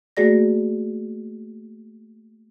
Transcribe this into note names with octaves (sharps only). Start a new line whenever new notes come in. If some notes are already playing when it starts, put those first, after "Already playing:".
A3 A#3 F#4 G#4 D5 A#6